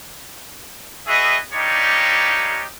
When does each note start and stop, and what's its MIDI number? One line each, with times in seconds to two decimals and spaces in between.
1.07 1.36 66
1.07 1.36 68
1.07 1.36 71
1.07 1.36 75
1.07 1.36 76
1.53 2.63 55
1.53 2.63 58
1.53 2.63 62
1.53 2.63 63
1.53 2.63 67
1.53 2.63 73